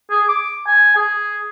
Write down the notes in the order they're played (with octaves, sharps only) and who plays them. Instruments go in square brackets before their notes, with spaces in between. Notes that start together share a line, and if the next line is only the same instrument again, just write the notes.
[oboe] G#4
D6
G#5
G#4